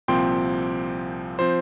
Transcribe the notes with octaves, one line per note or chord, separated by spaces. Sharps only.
C2 A#2 F3 C4 G5 C6
F3 C4 C5